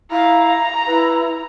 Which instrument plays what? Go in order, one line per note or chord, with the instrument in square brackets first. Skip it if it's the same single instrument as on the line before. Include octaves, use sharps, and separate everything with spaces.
[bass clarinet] E4 [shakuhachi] F5 [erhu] A#5
[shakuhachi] E4 [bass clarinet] B4